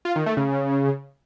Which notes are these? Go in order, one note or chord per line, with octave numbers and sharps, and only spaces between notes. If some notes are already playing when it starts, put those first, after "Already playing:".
F4
D#3
A3
C#3